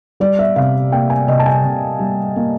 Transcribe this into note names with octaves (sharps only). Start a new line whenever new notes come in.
G3 D5
E5
C3 F5
A#3 G5
G#5
C3 D#5
A5
G#5
C3
G3
A#3